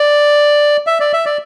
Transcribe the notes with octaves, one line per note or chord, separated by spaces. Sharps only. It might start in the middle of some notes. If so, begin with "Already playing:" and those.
Already playing: D5
E5
D5
E5
D5